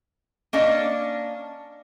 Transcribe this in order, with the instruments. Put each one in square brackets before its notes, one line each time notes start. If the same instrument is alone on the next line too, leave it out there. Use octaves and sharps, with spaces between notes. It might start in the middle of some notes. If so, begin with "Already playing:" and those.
[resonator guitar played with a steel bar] A#3 C#4 D4 D#5